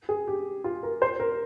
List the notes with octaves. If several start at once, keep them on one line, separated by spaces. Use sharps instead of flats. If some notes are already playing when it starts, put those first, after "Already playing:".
G#4
G4
F4
A#4
C5
A#4